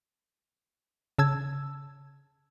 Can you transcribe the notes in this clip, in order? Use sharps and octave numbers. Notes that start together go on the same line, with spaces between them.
C#3 A5 E6 G#6